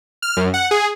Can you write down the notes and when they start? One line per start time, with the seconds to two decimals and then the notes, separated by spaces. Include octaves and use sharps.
0.22 F6
0.37 F#2
0.54 F#5
0.71 G#4